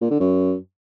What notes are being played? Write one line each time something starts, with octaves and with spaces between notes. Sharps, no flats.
A#2
D3
F#2